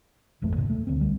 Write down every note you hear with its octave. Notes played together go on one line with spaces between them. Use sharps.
D#1 G#1 F2 A3
D#2 G#2 C3
A3
D2 C4
C2 G3